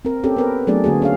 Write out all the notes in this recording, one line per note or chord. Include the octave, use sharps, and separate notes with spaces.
C4 A#4
C4 C#4 G4 A4
B3 A#4 B4
F#3 A3 B3 D4 G#4 D5
D3 A#3 F#4 G#4
C#4 G#4 F5